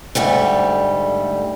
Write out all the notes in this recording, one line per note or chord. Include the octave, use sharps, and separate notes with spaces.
D2 G#2 G3 A3